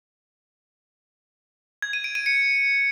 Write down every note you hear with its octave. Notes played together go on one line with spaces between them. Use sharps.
G#6
D#7
D7
D#7
C#7